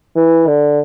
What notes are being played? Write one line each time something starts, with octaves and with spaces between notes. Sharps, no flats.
E3
D3